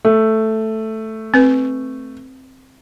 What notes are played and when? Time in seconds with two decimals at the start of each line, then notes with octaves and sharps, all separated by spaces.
0.05 A3
1.34 C4 B4